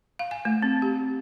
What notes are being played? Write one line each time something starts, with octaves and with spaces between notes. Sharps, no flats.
F5
G#5
A3
C4
G4